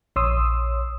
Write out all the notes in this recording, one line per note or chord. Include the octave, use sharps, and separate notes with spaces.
A#1 C#5 C6 D#6 E6